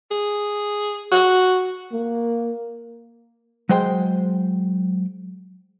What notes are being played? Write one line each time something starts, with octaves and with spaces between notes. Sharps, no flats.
G#4
F#4
A#3
F#3 G#3 C5 G5 C6